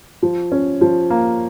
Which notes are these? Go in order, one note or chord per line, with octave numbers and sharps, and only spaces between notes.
F3
C#4
F3
A#3